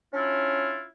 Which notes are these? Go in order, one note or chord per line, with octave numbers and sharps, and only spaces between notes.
C#4 D4 E4 F4